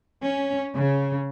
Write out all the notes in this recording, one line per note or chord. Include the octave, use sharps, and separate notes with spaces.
C#4
C#3